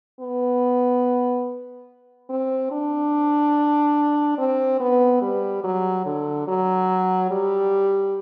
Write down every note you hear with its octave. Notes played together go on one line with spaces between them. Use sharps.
B3
C4
D4
C4
B3
G3
F#3
D3
F#3
G3